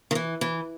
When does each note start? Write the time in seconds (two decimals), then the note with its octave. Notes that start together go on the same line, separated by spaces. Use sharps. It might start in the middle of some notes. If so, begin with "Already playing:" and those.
0.11 D#3
0.15 E3
0.41 E3